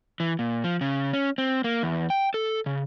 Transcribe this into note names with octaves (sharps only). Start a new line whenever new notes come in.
E3
A#2
F3
C#3
C#4
C4
A#3
E2
G5
A4
C#3